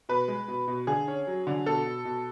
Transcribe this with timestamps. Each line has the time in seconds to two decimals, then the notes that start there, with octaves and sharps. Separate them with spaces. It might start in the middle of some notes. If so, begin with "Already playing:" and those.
0.09 B2 B4
0.28 G#3
0.48 B2
0.68 B2
0.87 D3 G#4
1.08 C#4
1.27 F#3
1.47 D3
1.66 B2 A4
1.86 B2
2.05 B2